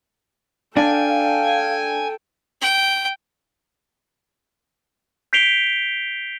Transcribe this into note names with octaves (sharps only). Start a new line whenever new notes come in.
D4 A4 F5 G5 G#5
G5
G6 B6 C7 D7 F7 G7